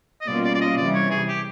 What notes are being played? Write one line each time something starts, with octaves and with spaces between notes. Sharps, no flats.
D#5
B2 G3 A#3 C#4 F4 D5
D5
D5
D#5
C3 E3 G3 D5
C#5
G#4
G4